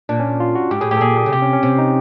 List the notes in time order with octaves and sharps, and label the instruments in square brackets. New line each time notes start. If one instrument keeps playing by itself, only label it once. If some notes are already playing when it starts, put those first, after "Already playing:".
[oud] A#2 [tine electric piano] D4
[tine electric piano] C#4
F4
F#4
[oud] G#2 [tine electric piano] G4
[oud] A2 [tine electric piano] G#4
[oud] A2 [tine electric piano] G4
[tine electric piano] A4
[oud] A#2 [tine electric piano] G#4
[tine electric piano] G#4
[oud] C#3
[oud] C3 [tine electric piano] G4
[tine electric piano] C#4
C#4
[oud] C3 [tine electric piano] C4
[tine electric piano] D#4